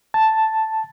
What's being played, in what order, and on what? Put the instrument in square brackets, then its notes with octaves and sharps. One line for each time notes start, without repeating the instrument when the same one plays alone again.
[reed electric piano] A5